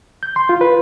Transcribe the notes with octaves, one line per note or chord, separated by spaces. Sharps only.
G6
C6
F4
B4